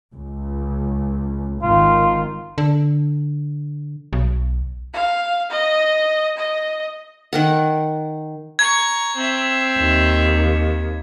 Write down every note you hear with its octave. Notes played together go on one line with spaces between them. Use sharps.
C#2
G#1 D#3 F4
D3
B1
F5
D#5
D#5
D#3 A#4 F#5
A#5 C#6 G#6
C4 E5
D#2